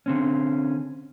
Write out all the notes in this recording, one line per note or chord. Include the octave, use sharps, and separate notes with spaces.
D3 C4 C#4